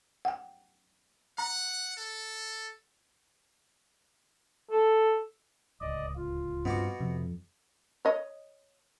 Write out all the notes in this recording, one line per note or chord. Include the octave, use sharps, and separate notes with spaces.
F#5 G5
F#5 A#5
A4
A4
D1 C#2 D5 D#5
F4
G2 B2 C4 F#4 D6
F2 C3
C#5 D#5